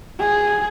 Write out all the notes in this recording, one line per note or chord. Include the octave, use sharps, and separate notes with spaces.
G#4